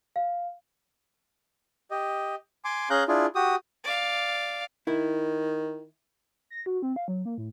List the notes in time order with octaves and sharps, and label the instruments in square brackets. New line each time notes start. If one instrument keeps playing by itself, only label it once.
[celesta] F5
[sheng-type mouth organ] G4 D#5
G#5 C6 D6
C#4 G#4 F5 A#5 F#6 G6
D4 E4 F4 G#4
F#4 G4 D#6
[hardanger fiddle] D5 F5
[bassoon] D#3 [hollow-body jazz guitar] E4
[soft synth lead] A#6
F#4
C4
F5
F#3
A#3
A2